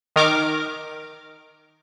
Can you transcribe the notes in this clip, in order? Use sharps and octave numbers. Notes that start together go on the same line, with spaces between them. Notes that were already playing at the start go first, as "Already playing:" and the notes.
D#3 A#4 D6 F6